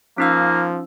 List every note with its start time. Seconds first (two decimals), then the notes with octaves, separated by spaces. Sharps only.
0.18 F3 A#3 C#4 D#4 E6